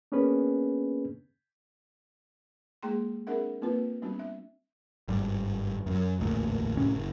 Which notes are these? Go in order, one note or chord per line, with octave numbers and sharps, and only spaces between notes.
A#3 B3 C#4 D4 G#4 B4
G#3 A#3 G#4 G5 A#5 C6
C4 D4 G#4 A#4 E5 F#5
A#3 C4 F4 B4
G3 B3 C4 D4 F#4
E5
G#1 G2 G3
F#2 F#3
E1 A1 D2 A#2
C2 A2 C3 C#4
F#1